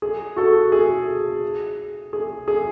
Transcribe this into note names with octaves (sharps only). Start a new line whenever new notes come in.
G#4
F#4 A4
G#4
G#4
G#4